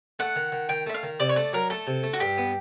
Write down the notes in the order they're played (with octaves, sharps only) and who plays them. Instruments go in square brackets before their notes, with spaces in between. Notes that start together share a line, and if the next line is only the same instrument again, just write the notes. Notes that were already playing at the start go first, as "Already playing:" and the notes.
[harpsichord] A3 [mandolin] F#5
[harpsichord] D#3
D#3
[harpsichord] D#3 [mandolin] G5
[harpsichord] A3 [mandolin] E5
[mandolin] F5
[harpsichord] D#3
[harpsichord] C3 [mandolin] D5
[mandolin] C#5
[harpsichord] A3 [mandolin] D5
[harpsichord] F#3 [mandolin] A#4
[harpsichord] A3 [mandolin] A4
[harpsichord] C3
A3
[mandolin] F#4
[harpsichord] G2 [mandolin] G4
[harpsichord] B3